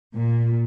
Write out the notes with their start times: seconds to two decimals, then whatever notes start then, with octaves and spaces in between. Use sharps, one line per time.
0.15 A#2